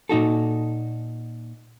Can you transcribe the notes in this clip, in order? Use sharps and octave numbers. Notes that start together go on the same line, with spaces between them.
A#2 D#4 F#4 A4